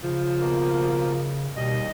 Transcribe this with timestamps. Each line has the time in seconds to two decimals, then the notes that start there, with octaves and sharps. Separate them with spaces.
0.03 C#3 F3
0.39 B2 A#3
1.56 D#2 B2 G3 D#5